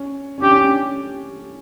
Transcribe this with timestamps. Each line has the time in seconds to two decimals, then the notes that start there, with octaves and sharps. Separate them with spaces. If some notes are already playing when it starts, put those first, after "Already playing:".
Already playing: C#4
0.38 C#4
0.42 D4 G4
0.51 C#4
0.55 D4